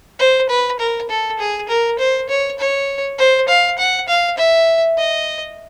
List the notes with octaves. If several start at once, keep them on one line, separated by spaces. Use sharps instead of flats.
C5
B4
A#4
A4
G#4
A#4
C5
C#5
C#5
C5
F5
F#5
F5
E5
D#5